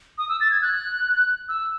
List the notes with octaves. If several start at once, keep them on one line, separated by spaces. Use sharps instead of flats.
D#6
E6
A6
G#6
F#6
E6